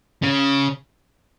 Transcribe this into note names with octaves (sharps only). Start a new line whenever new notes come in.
C#3